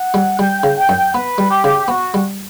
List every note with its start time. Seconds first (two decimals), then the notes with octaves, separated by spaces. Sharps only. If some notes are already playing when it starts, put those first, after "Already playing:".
Already playing: F#5
0.14 G3
0.39 G3 G5
0.63 C#3
0.77 G5
0.89 F#2
1.14 B3 B4
1.38 G3
1.51 G4
1.64 C#3
1.88 B3 F#4
2.14 G3